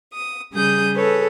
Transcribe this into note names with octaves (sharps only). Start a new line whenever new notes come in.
D#6
C#3 G3 G#4 D#6 G6
G#4 A4 B4 C#5